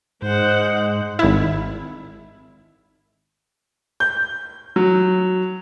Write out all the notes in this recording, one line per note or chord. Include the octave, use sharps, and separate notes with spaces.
G#2 G#3 C5 F#5
G#1 E4
G6
F#3